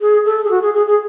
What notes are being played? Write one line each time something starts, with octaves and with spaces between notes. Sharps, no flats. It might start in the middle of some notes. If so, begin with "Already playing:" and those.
G#4
A4
G#4
F#4
G#4
G#4
G#4